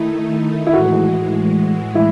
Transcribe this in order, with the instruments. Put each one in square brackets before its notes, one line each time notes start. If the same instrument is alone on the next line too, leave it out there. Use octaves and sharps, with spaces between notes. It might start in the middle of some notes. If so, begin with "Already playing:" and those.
Already playing: [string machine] D#3 A3 D#4 [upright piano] E4
[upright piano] E4
[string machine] A2 E3 G#3 [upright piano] F#4
[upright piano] E4